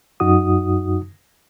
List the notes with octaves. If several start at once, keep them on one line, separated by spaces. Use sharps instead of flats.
F#2 D#4 F#4 D#6